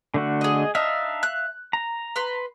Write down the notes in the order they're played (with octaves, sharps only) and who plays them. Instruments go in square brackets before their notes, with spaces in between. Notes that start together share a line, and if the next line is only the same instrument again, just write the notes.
[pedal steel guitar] D3 A3 F#4
[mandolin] G#4 D#5
[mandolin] D4 D#4 [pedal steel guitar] E5 F5
[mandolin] F#6
[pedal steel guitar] A#5
[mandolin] B4 C6